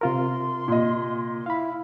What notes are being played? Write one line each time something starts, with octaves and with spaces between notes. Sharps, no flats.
C3 F4 A#4 C6
A#2 D#5
E4 F5 B5